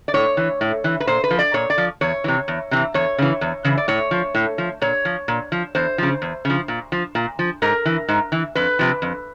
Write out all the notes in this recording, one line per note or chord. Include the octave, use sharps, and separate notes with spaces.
D5
A2 C#5
E3
A2
E3
B4
A#2 C5
B4
F3
D5
A#2 C#5
D5
F3
E2 C#5
C3 E3
E2
C3 E3
E2 C#5
C#3 E3
E2
C#3 E3
D5
A2 C#5
F3
A2
F3
A#2 C#5
F3
A#2
F3
E2 C5
C#3 F3
E2
C#3 F3
A#2
F3
A#2
F3
G#2 A#4
E3
G#2
E3
F2 B4
C3 F3
F2